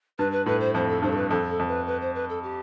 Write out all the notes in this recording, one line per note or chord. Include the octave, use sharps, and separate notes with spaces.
G2 B4
B4
A2 B4
C5
F2 C5
A4
G2 C5
A4
B4
F2 A4
A4
F2
B4
B4
C5
B4
A4
G4